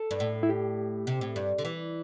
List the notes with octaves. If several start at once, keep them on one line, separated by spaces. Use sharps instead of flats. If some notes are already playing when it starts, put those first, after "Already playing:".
Already playing: A4
G2
A2
E4
G4
C3
A2
G2
D3
E3